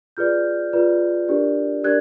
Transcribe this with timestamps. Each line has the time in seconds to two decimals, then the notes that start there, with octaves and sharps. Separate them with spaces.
0.17 F4 G#4 B4 D5 F6 G6
0.73 F4 G#4 B4 D5
1.28 D4 G4 A#4 D5
1.84 D4 G4 A#4 D5 F#6 G#6